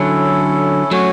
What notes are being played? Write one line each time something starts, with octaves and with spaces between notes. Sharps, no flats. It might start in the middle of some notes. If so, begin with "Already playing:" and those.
Already playing: D3 F#3 C#4 E4 A4
F#3 A3 C#4 F#4 C#5 G#5